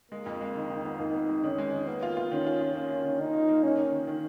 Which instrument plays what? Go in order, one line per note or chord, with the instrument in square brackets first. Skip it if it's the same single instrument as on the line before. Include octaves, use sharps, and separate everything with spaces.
[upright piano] G#3 [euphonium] A#3
[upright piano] F2
G#3
D#3
D#3
B3
[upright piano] F2 [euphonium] D#4
[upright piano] B3
G#3
[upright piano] D#3 [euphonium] C#4
[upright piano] G#3
D#3
[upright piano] A#3 [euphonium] B3
[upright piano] F4
F4
[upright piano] D#3 [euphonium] C#4
[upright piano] F4
F4
[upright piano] A#3 [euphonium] C#4
[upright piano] F4
D#3
[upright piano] D#3 [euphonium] D#4
[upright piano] F4
A#3
[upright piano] D#3 [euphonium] C#4
[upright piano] D#3
D#3
D#3